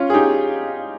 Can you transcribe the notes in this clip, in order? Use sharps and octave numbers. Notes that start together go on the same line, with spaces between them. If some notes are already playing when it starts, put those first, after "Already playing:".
Already playing: C#4 F4
G#4
D#4 G4